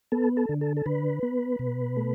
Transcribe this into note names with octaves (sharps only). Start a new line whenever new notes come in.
B3 A4
A4
D3
A4
A4
D3 B4
B3
B2
A3